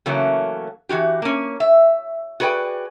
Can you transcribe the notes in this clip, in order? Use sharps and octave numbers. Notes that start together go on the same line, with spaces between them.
C#3 E3 F#3 A3 A#3 C#4
E3 F#3 F#4 G4
A#3 C#4
E5
F#4 G#4 B4 D5 G5